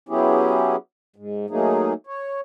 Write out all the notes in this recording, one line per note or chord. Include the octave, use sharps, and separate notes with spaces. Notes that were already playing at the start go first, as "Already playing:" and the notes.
F#3 B3 C#4 E4 G4 G#4
G#2
F#3 A3 A#3 D#4 G#4
C#5